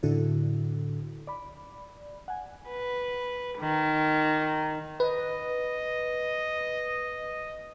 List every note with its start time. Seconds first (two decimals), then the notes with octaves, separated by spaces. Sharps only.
0.03 A2 D3 D4 E4 F#4 A4
1.27 D5 B5
2.28 F#5 G#5
2.67 B4
3.59 D#3
5.00 B4 D#5